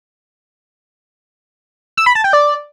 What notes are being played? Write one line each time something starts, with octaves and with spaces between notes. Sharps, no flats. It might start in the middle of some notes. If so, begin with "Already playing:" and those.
E6
B5
A5
G5
D5